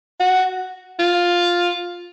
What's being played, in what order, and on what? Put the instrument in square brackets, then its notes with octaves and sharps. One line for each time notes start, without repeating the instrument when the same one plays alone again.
[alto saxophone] F#4
F4